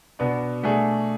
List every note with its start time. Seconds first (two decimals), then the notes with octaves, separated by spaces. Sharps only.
0.19 B2 B3 D4
0.63 B2 A3 D4 G#4